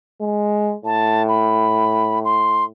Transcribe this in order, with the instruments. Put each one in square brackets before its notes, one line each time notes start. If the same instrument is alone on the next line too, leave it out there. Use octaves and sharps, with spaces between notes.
[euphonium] G#3
[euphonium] A2 [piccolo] A5
[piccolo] B5
C6